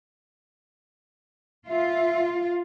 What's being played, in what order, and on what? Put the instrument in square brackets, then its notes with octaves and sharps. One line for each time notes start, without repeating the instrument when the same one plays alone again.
[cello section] F4 [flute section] E5